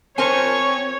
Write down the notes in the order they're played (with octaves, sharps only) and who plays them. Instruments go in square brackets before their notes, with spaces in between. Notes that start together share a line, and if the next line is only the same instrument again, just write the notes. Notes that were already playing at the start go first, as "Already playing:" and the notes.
[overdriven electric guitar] C4 A5 [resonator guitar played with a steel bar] A#4 C5 G#5 [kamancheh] C#5 [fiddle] C#6